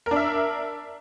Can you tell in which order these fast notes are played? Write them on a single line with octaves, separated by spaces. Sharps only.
A#4 D4 E5